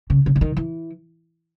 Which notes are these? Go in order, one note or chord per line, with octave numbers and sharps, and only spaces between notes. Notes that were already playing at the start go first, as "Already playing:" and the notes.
C#3
C#3
D3
D#3
E3